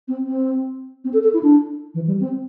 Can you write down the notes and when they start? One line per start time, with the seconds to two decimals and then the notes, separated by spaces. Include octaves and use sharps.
0.08 C4
0.27 C4
1.05 C4
1.14 A4
1.24 A4
1.34 E4
1.43 D4
1.95 E3
2.07 G3
2.21 C4